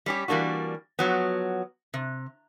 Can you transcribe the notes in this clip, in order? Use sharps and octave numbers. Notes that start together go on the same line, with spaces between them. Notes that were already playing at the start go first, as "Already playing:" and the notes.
G3 C#4 G4
E3 G3 A#3 D4 F#4
F3 F#3 B3
C3